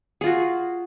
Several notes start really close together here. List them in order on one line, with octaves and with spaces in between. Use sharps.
G#4 F4 F#4